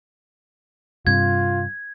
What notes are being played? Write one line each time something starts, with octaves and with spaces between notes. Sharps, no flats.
G2 C3 F4 G#6